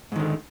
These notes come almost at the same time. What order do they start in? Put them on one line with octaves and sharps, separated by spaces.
G#2 D#3 D3